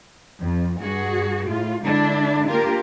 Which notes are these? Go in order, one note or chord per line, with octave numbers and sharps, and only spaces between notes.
F2
G2 F#4 G#4
A2 F4
D3 G#3 D4 E4
A#3 D4 F4 G4 A#4